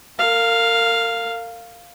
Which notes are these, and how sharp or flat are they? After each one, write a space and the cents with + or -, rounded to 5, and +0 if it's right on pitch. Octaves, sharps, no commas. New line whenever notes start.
A#4 -35 F5 +0